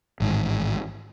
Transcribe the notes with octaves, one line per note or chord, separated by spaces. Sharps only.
A1 G#2 D#3